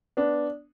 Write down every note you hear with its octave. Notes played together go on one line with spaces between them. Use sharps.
B3 D4